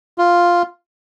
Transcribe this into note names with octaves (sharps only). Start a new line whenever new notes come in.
F4